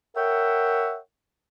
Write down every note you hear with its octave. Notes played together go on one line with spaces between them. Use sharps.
A#4 C#5 E5 F#5 G5